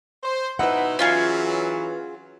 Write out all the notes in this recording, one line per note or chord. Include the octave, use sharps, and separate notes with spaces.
C5
B2 D#4 E4 B4 F#5
E3 F#3 C#4 F4 G#4